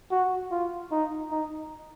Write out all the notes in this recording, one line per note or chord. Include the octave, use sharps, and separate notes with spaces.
F#4
F4
D#4
D#4